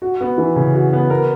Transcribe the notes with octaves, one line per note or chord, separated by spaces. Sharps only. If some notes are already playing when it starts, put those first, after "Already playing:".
F#4
B3
E3
C#3
F#4
B3
A#4